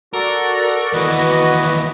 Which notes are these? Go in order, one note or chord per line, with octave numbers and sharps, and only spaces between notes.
F#4 A4 A#4 D5
D#2 E3 F#4 B4 D#5